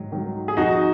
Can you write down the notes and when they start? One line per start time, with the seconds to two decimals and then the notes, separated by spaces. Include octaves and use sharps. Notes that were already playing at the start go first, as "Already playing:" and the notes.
Already playing: G#2 D#3 F#3
0.12 D#3 F#3
0.48 G#4
0.57 F2 D#4 F#4